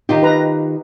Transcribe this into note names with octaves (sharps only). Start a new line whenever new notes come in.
D#3 D#4 F4 G4
D#4 B4 A#5